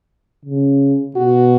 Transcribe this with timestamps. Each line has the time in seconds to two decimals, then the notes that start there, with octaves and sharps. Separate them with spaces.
0.45 C#3
1.16 B2 F#4